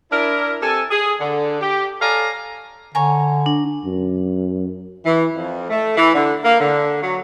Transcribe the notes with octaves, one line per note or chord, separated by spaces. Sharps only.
D4 E4 A#4
C3 A4 G#5
G#4
D3
G4
A4 C#5 D5 F5 G#5 A#5
D3 C#5 G#5 A#5
D4
F#2
E3
F2
A3
E3
D3
A#3
D3
F#3